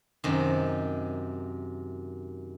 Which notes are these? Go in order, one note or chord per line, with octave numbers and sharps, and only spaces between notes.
F#2 C3 D#3